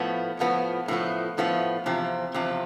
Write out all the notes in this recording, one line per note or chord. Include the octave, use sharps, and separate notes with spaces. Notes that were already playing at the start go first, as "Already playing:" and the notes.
Already playing: A2 F3 B3
A2 F3 B3
A2 F3 B3
A2 F3 B3
E2 C3 F3 C4
E2 C3 F3 C4